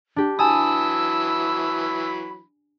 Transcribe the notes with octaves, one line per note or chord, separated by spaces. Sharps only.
D4 G4
E3 F#3 G#5 A5 B5 D#6 E6